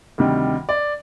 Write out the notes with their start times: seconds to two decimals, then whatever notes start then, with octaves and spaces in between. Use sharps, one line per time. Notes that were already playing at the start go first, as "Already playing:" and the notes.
0.18 D2 C3 D#3 G3
0.69 D5